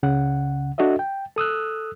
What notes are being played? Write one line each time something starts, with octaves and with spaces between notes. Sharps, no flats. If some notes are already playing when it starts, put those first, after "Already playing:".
C#2 C#3 F#5
D4 F#4 A4 D#5 E5
G5
A4 D#6 E6 F#6